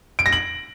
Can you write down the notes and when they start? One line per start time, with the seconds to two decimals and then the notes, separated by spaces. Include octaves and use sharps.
0.19 D7
0.26 A#6
0.32 F#7